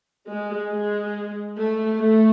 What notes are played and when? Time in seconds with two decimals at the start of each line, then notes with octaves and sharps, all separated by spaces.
0.28 G#3
0.71 G#3
1.57 A3
1.99 A3